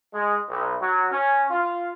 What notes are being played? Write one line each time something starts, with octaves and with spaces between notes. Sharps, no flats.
G#3
B1
F#3
C#4
F4